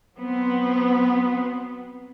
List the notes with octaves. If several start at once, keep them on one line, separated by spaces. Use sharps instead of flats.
F#3 B3 C4